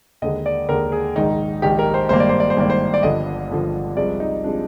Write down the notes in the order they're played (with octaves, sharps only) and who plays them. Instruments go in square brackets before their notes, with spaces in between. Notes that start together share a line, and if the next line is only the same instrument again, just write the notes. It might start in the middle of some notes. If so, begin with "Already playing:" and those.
[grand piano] D#2 D3 G#3 D#5
D5
D#2 D3 G#3 A#4
G#4
A#1 G#2 D#3 D#4
A#1 G#2 D#3 G4
A#4
C5
G#1 G2 D#3 A#3 C5
D5
C5
D5
C5
G#1 G2 D#3 A#3 D5
C5
D5
G1 G2 D3 F3 D#5
G1 G2 D3 F3
C2 C3 F3 G#3 D5
D#4
C3 F3 G#3 D4